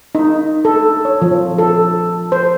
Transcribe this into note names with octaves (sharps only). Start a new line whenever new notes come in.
D#4
A4
C#5
F3
A4
C5